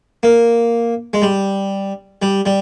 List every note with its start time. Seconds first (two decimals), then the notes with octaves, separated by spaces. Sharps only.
0.23 A#3
1.13 G#3
1.22 G3
2.22 G3
2.46 G3